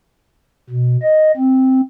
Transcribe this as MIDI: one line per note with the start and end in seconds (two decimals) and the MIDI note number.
0.70 0.96 47
1.02 1.32 75
1.37 1.81 60